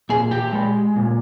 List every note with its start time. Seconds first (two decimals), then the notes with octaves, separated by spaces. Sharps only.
0.09 A#2 G#4
0.31 G4
0.53 G#3
0.96 A#2